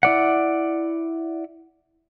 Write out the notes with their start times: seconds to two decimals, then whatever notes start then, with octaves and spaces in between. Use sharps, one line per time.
0.03 E4 D5 F#5